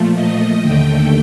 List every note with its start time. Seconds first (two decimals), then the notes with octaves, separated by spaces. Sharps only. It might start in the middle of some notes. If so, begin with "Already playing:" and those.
Already playing: A#2 F3 A3
0.14 D#5
0.62 D#2 D3 A3 G5